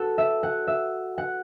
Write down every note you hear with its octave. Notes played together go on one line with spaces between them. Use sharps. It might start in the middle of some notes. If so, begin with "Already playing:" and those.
Already playing: F#4 A4
E5
F#5
E5
F#5